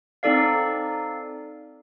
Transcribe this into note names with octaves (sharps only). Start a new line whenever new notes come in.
C4 D#4 A4 D5 F5